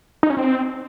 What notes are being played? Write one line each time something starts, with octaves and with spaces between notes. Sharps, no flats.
D#4
C#4
C4